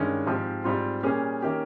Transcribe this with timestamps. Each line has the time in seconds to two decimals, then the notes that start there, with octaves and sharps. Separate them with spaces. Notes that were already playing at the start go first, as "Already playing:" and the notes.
Already playing: G2 D#3 G#3 C#4
0.26 G#2 F3 C4 G4
0.64 G#2 G3 C4 F4
1.03 A#2 G3 A#3 C#4 G#4
1.42 D#3 A#3 C#4 G4